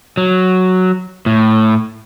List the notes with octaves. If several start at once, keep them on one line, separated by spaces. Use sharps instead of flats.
F#3
A2